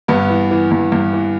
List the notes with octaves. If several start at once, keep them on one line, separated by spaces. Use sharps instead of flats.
G2 B3
E3
E3
G2
G2
E3